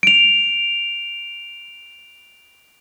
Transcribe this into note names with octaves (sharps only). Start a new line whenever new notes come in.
D7 F7